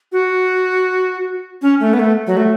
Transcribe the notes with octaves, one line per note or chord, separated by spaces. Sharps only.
F#4
C#4
A3
B3
A3
F#3
A3